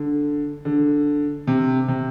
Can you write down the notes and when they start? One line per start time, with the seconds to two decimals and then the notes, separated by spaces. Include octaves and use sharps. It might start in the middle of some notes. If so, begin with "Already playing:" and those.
Already playing: D3
0.65 D3
1.47 C3
1.88 C3